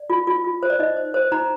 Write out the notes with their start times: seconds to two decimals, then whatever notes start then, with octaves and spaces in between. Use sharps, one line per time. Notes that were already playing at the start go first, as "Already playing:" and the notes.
Already playing: D5
0.10 F4
0.27 F4
0.44 F4
0.63 C5
0.70 D5
0.79 D#4 D#5
0.97 C5
1.14 C5
1.32 D#4 A#5